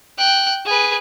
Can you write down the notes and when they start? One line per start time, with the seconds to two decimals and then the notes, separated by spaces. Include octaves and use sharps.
0.18 G5 F#6
0.66 G#4 B4